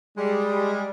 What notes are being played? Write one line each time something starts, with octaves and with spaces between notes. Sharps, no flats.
G3 G#3